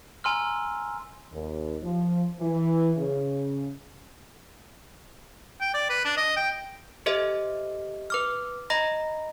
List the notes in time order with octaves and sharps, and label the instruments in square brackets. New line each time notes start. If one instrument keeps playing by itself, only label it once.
[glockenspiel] G#5 A#5 C6 E6 F6
[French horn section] D#2
F3
E3
C#3
[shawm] G5
D5
B4
D4
D#5
G5
[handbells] G4 A4 C5 D#5 E5
B4 D6 F6
D#5 A#5 B5 A#6